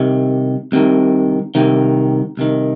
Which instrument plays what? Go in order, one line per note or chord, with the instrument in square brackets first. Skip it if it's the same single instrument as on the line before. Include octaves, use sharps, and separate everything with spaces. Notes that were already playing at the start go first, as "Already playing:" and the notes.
Already playing: [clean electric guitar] C2 C3 D#3
C2 C3 D#3
C2 C3 D#3
C2 C3 D#3